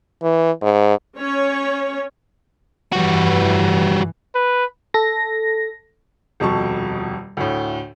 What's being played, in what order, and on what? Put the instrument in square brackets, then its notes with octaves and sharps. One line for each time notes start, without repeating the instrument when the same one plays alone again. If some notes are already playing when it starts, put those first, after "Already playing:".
[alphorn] E3
G#2
[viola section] C#4 C#5
[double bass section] F1 G2 E3 [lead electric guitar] G3 F#4
[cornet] B4
[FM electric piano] A4 A#6
[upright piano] D#1 F2 B2 A5 C#6
D2 A2